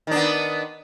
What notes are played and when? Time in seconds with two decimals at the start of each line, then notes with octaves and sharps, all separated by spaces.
0.07 D#3
0.11 D4
0.16 B3